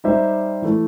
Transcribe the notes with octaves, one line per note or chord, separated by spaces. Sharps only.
G3 D#4 G4 C5 E5
E3 A3 E4